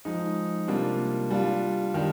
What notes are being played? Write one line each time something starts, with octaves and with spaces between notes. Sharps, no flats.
F3 G#3 D#4
C3 G3 A#3 D4 F4
G3 D4 F4
D#3 G3 D4